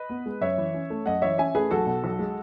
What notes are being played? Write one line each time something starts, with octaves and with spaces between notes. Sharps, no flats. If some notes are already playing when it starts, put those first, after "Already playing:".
Already playing: B4 D#5
B3
G#3
F#2 C#5 E5
E3
C#4
A3
F#2 D#5 F#5
E3 C#5 E5
C#4 E5 G#5
A3 G#4 B4
B1 F#4 A4
B2
B1
G#3